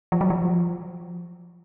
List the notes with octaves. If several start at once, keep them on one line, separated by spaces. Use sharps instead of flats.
F3
F#3
F3